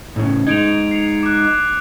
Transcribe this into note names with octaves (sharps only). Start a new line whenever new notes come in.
A2 C#3
G#3 D#4 G#6 D7 F7
C7 C#7 F7
D6 F#6